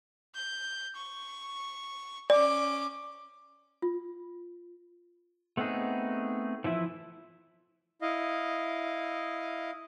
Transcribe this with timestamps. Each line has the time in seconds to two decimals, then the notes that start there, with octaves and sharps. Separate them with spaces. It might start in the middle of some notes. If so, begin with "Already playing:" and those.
0.35 G6
0.96 C#6
2.30 C#4 D5 D6
3.82 F4
5.57 A3 B3 C4 D#4 G#4
6.64 E3 F3 E4 E5
8.02 E4 D#5 F5